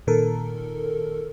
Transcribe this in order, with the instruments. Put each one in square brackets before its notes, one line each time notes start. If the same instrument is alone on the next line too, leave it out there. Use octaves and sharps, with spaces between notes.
[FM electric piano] A#2 D#3 A4 A#4